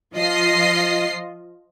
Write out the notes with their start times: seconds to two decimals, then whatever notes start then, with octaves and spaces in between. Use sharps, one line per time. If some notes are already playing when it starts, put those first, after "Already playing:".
0.14 F3 F4 D#5 C7